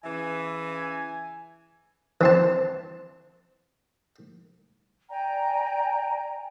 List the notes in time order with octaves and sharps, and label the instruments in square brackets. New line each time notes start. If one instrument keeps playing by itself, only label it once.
[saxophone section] C#3 E3 [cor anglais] G#5
[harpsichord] E3 C4 A5
[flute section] D5 G5 G#5 A#5